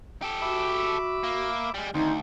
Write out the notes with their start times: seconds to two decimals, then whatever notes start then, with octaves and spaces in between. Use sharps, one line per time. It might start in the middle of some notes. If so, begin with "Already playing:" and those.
0.22 G4 A4
0.42 F#4 E5 B5 D6
1.24 A#3
1.74 G3 G#3
1.94 D2 D#3 C4 D#4